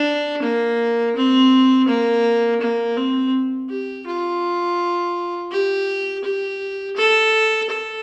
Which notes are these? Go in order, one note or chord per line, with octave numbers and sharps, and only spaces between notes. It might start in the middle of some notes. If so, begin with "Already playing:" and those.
Already playing: D4
A#3
C4
A#3
A#3
C4
G4
F4
G4
G4
A4
A4